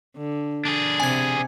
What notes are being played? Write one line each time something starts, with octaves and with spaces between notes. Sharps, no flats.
D3
D4 G#4
C3 G#5 G#6